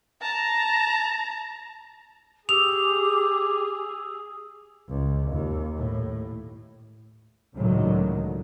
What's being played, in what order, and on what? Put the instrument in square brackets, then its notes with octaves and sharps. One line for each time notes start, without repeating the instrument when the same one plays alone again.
[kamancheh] A5 A#5
[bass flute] G4 [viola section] G#4 [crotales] D#6 E6 [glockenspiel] F7
[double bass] C#2
D#2
A2
[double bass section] C#2 A2 D3 D#3 F#3